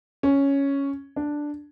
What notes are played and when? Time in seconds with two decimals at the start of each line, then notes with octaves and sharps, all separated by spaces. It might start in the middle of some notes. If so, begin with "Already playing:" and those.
0.23 C#4
1.16 D4